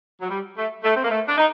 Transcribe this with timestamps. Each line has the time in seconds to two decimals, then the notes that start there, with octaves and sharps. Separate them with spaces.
0.21 F#3
0.30 G3
0.58 A3
0.84 A3
0.95 C4
1.04 A#3
1.10 A3
1.28 D4
1.37 D#4